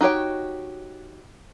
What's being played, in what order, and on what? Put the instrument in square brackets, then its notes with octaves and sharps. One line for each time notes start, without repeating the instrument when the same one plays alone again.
[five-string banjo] D#4 F#4 G4 C#5 G5